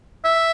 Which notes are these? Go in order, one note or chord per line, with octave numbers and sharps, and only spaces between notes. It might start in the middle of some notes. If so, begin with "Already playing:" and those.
E5